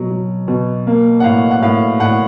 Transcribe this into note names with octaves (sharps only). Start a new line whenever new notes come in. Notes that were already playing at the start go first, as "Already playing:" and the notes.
Already playing: B2 F#3
F#3
B2
A#3
F#5
A2 F5
F#5
A2 F5
A2 F#5